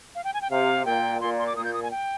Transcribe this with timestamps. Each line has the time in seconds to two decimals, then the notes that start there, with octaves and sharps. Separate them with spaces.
0.15 F5
0.24 G5
0.34 G#5
0.42 G5
0.50 C3 F5
0.85 A#2 G5
1.21 A#2 C6
1.38 C6
1.47 D6
1.56 A#2 D#6
1.64 G6
1.73 D#6
1.83 G#5
1.91 G5